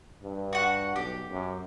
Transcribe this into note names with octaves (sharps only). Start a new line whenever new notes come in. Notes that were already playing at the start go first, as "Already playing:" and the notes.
G2
F#4 F#5
B1 G4
F#2